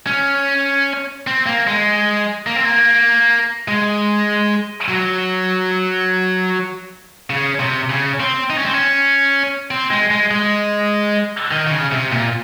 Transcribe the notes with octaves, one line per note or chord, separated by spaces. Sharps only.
C#4
C4
A#3
G#3
A#3
C4
A#3
G#3
F#3
C#3
C3
C#3
C4
D#4
C#4
C4
C#4
C4
G#3
G#3
G#3
D#3
D#3
C#3
C3
A#2